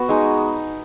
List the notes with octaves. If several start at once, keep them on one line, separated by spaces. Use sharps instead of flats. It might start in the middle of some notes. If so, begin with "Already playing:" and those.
Already playing: B3 F#4
G#3 D#4